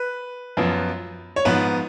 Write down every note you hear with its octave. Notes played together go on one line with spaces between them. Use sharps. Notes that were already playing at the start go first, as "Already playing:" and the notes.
Already playing: B4
F#2 F3 B3
C#5
G#2 F3 B3 B4